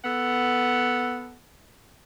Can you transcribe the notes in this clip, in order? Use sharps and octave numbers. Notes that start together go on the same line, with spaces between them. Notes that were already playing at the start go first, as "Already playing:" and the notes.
B3 A4 F#5